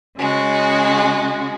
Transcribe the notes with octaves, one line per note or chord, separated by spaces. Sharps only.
C#3 G#3 F#4